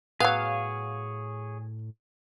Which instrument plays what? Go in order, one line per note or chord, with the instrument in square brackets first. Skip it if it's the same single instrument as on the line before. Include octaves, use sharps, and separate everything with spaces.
[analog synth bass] A2 [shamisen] F#3 B3 [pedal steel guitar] G#4 C#5 [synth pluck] F5